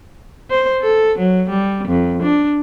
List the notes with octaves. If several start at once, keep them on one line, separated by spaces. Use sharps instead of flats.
C5
A4
F#3
G3
F2
D4